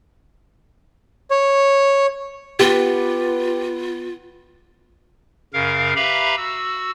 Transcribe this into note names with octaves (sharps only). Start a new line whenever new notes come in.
C#5
B3 F4 G4
F#2 C#3 A#4 F5
G4 B4 E5 F5 A#5 B5
F#4 E6